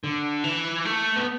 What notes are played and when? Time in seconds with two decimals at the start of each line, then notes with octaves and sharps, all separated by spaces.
0.04 D3
0.44 E3
0.85 A3
1.16 B3